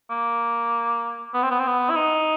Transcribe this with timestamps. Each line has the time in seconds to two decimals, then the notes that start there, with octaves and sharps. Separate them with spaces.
0.10 A#3
1.34 B3
1.43 C4
1.51 B3
1.59 C4
1.67 B3
1.90 E4
1.96 D#4